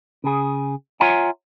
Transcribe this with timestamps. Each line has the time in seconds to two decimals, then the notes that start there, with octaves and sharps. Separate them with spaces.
0.24 C#3 G#4
1.00 F4 C#5 E5 F#5 G#5 A#5